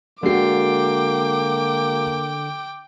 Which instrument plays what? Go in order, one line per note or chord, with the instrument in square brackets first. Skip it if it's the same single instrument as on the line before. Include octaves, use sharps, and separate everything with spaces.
[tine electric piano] D3 C7 [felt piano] G#3 F#4 [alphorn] A#3 [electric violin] G5 D6